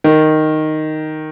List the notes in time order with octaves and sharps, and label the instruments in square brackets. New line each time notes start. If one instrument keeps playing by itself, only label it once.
[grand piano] D#3